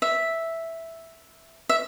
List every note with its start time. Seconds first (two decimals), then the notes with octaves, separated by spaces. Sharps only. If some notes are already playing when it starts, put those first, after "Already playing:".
0.02 E5
1.69 E5